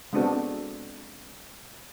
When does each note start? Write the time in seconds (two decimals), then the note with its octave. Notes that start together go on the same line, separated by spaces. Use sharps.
0.13 G#3 B3 C4 D4 F#4 A4